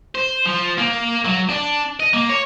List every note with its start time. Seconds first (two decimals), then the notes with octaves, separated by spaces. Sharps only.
0.15 C5
0.46 F3
0.78 A#3
1.26 F#3
1.50 D4
2.00 D#5
2.13 A#3
2.29 C#5